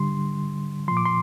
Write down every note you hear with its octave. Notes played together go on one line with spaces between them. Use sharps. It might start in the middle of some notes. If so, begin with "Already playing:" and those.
Already playing: D3 G3 C6
A#2 F3 C6
D6
C6